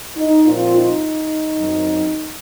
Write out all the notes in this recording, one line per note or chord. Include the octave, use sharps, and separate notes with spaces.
D#4
A#2 F3 C4 F4
D#4
F#2 D#3 F#3 C4